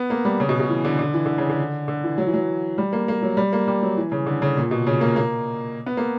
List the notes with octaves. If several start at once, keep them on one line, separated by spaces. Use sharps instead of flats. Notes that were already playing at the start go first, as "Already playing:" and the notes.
Already playing: B3
A#3
G3
C#3
B2
B2
E3
D3
D3
E3
D3
C#3
D3
D3
E3
F#3
E3
F#3
G3
A#3
A#3
F#3
G3
A#3
G3
F#3
E3
C#3
D3
C#3
A#2
B2
C#3
A#3
A#3
B3
A#3